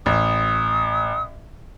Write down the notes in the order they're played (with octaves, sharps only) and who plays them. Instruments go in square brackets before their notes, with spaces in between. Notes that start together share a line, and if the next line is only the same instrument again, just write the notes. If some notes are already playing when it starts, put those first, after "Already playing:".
[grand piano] A1 [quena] D#6